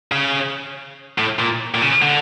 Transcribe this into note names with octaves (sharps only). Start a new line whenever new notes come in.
C#3
A2
A#2
A#2
C#3
D3